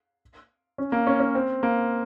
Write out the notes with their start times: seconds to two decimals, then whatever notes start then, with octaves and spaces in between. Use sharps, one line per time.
0.78 C#4
0.92 A#3
1.07 C#4
1.20 C#4
1.35 C4
1.63 A#3